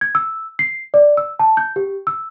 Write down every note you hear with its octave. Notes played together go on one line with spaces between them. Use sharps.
G#6
E6
C7
D5
E6
A5
G6
G4
E6